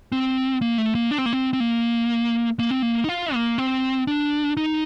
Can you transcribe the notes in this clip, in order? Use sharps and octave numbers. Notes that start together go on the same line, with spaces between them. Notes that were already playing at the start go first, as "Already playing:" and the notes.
C4
A#3
A3
A#3
D4
C4
A#3
C4
C4
A#3
A#3
C4
A#3
D#4
F4
A#3
C4
D4
D#4